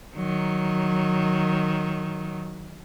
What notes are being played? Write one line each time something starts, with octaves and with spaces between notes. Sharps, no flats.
D#3 F#3